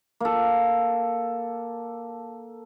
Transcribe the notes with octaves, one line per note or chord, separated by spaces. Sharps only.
A#3 A4